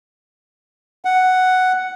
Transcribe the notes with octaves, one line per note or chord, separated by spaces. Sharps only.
F#5